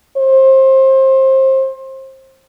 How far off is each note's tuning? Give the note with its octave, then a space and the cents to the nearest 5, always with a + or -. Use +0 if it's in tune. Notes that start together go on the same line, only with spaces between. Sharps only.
C5 +25